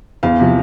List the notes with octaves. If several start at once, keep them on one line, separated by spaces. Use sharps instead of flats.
E2 F5
C3 F3